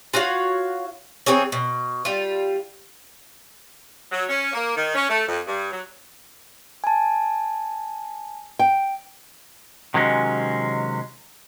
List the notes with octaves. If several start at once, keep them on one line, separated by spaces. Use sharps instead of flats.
F4 F#4 C#5 F5
E3 C4 G#4 C#5
B2
G3 F4
F#3
C#4
A#3
D#3
C#4
A3
F2
G2
F#3
G#5 A5
G5
C3 D#3 F#3 G#3 C#4